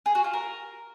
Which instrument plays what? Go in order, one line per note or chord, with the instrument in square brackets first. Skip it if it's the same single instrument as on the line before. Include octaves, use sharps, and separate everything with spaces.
[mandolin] G#4
F#4
F4
A#4